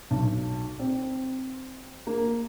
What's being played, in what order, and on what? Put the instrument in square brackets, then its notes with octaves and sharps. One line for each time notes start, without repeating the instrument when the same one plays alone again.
[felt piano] B1
C4
A#3